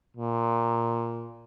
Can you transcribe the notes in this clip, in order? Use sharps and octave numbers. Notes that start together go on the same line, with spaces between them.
A#2